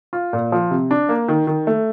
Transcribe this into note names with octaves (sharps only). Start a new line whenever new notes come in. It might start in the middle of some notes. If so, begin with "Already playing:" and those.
F4
A#2
F3
C3
D4
A#3
D#3
D#3
A3